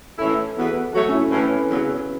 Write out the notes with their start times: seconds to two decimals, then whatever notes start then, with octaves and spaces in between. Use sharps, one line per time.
0.18 A2 E3 C#4 E4 A4
0.56 E2 E3 B3 F#4 B4
0.93 F#3 A3 F#4 A4 C#5
1.08 C#4
1.12 E4
1.30 A2 E3 C#4 B4
1.68 E2 C#3 F#3